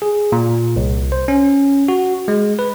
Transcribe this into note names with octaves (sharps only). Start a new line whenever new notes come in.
G#4
A#2
C2
C5
C#4
F#4
G#3
B4